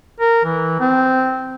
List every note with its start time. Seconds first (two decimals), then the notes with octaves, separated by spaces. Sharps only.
0.20 A#4
0.44 E3
0.80 C4